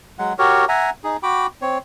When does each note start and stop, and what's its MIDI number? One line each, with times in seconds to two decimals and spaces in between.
0.19 0.33 54
0.19 0.33 56
0.19 0.33 78
0.39 0.65 66
0.39 0.65 67
0.39 0.65 70
0.39 0.65 73
0.69 0.90 76
0.69 0.90 78
0.69 0.90 80
0.69 0.90 82
1.04 1.17 63
1.04 1.17 68
1.23 1.47 66
1.23 1.47 79
1.23 1.47 83
1.23 1.47 86
1.62 1.78 60
1.62 1.78 73